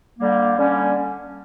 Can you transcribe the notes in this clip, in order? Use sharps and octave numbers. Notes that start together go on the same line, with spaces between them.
D3 G3 A#3
D3 G3 A#3 C#4